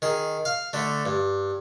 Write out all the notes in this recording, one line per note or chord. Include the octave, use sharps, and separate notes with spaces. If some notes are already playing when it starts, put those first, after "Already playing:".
D#3 G#4
F5
D3 A3
G2